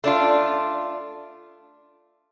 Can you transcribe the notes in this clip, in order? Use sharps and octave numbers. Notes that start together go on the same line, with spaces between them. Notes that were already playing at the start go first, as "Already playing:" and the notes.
A3 D4 F4